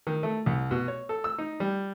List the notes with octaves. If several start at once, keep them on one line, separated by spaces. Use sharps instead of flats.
D#3
A3
C2
B2
C#5
A4
E6
D#4
G3